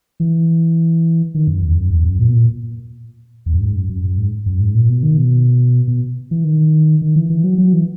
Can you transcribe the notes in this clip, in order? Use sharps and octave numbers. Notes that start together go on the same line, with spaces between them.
E3
D#3
F#2
E2
F#2
E2
F#2
A#2
B2
A#2
E2
F#2
G#2
F#2
F#2
F#2
G#2
F#2
G#2
A#2
B2
D#3
B2
B2
E3
D#3
D#3
E3
E3
F#3
F#3
E3